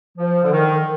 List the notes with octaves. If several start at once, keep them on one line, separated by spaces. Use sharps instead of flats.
F3
D3
D#3